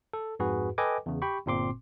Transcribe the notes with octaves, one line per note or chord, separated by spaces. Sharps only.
A4
F2 G#2 F#4 G#4 B4
A4 B4 D#5 G5 G#5 D6
E2 C#3
G4 G5 B5 C#6
G1 A#2 C4 C6 D6